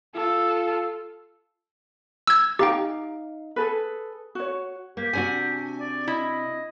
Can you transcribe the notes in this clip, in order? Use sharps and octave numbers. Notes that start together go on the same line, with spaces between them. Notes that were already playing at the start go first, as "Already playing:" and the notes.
F4 A4
E6 G#6
D#4 G4 F5 G5 A#5
G#4 A4 B4
F#4 C#5
A#3 G4
C3 D4 F#4 G#5
D5
E4 D#5